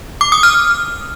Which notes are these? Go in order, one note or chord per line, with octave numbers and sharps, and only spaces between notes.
D6
D#6
F6